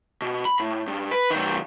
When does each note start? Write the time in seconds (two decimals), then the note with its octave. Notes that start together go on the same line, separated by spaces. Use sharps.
0.22 B2
0.45 B5
0.59 A2
0.87 G2
1.11 B4
1.30 B1 D#3